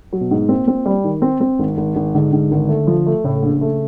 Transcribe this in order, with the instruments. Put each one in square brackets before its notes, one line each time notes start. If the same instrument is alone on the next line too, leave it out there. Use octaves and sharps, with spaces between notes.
[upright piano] F#3
[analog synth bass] B2
[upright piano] G#2
[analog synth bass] A#2 [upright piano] C4
[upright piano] C4
G3
D#3
C4
C4
G#1
G#1
G#1
[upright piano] G#2 [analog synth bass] D3
[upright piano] G#2
G#1
A3
F3
A3
[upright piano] A2 [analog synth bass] C#3
[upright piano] A#1
A3